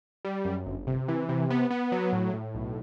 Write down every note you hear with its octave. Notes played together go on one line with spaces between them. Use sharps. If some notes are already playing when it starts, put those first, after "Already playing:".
G3
F#2
G1
C3
E3
C3
B3
B3
F#3
A2
A2
B1